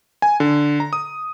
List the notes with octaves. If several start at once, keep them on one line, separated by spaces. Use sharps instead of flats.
G#5
D3
A#5
D#6